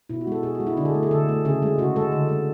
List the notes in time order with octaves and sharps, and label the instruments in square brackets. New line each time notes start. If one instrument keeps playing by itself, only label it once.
[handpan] B2 E4
F#4
G#3 A4
B2 G#4
F#4
G#3
E4
D3 D4
G#4
A3
G#4
D3 A4
A3
C#3 G#4
G#3
C#3 F#4
G#3 A4
D3
G#3